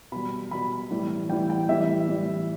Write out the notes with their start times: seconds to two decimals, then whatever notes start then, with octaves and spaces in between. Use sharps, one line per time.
0.12 B2 G3 B5
0.51 B2 G3 B5
0.91 A2 E3 G3
1.29 A2 E3 G3 G5
1.50 G5
1.69 A2 E3 G3 E5
2.08 A2 E3 G3